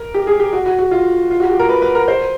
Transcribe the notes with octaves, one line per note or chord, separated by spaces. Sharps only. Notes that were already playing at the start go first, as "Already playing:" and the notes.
Already playing: A#4
G4
G#4
G4
F#4
F#4
F#4
F4
F4
F#4
G4
A#4
B4
B4
A#4
C5